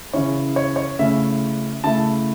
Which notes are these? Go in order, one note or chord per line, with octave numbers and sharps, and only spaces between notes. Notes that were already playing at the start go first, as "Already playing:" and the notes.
C#3 E3 C#4 E4 C#5
C#5
C#5
C#3 A3 C#4 E4 E5
C#3 A3 E4 A5